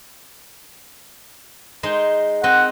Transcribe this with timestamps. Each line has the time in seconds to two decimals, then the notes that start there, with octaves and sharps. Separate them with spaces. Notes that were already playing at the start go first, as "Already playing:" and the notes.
1.83 G#3 D#4 C5
2.44 C4 D#5 F#5